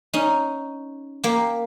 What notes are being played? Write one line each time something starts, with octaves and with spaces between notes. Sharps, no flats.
C#4 D#4
A#3 G4